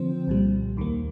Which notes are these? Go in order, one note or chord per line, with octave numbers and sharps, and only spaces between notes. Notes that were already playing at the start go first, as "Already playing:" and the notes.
Already playing: D3 F3 C4 C5
C2 A#2 G3
D#2 D#3 A#3